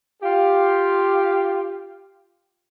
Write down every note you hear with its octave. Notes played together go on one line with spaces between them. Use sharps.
F4 G4